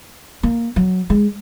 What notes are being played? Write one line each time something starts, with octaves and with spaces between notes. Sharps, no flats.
A#3
F#3
G#3